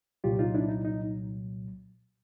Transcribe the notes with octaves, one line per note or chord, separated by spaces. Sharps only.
C2 A#2 F#3 F4 G4
D#4 F4
D4 E4
D#4
D#4